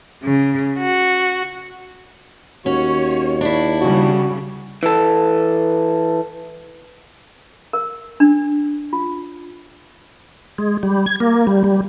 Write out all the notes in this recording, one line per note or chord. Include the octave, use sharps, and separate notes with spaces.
C#3
F#4
D#2 C#4 F#4 C#5
D4 E4
C#3 G3 F#4
E3 A4
A#4
D4
F4
G#3
G3
G#6
A#3
G3
G3